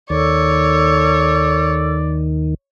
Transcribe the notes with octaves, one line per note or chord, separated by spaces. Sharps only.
D#2 D#3 A4 C#5 D5